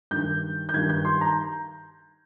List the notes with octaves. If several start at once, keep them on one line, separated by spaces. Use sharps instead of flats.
G2 D#3 G6
G6
G2 D#3 G#6
G6
C6
A#5